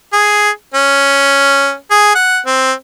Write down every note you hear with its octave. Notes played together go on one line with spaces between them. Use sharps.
G#4
C#4
G#4
F#5
C4